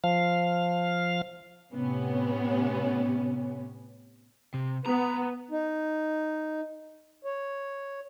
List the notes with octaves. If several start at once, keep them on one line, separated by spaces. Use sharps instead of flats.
F3 F5
A2 C3 B3 C#4
C3
B3 A#5
D#4
C#5